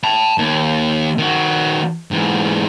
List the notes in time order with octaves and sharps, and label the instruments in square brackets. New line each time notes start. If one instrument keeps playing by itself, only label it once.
[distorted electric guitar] A5 B5
D#2
D#3 F#4
G#2 E3